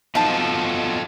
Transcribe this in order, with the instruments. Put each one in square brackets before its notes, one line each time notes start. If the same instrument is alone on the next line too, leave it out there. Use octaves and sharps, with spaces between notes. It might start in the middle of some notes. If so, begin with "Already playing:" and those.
[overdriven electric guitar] B2 F3 [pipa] D#4 A5 [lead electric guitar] F4 A4